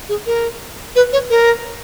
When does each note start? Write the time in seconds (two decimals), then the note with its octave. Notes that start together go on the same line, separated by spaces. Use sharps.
0.09 G#4
0.26 A#4
0.96 B4
1.13 C#5
1.30 A#4